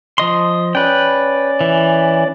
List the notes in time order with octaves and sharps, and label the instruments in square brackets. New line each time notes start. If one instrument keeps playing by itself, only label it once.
[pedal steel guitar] F3 D#5 C6
[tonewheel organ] C#4 D5 [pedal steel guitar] B4 G5
[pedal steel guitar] E3